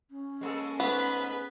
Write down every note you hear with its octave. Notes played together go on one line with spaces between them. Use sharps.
C#4
G#3 A#3 A4
G#2 A3 B3 B4 B5